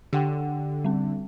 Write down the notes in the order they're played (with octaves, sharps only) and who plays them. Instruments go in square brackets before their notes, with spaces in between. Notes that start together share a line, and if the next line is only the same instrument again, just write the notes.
[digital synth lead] D3 [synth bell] G4 F#5 G5
[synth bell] G3 C4